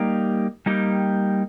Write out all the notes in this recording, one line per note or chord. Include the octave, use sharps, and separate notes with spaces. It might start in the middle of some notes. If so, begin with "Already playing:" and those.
Already playing: G3 A#3 D#4 G4
G3 A#3 D#4 G4